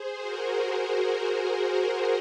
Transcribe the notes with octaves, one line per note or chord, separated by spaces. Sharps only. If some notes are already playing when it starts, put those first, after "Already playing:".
Already playing: G#4 C5
F#4 A#4